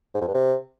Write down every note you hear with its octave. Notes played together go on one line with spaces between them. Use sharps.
G#2
F2
G2
C3